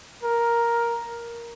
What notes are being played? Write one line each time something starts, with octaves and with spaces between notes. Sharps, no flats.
A#4